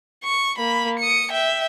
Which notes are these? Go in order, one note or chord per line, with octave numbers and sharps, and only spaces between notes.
C#6
A#3 B5
D#6 C#7
E5 G5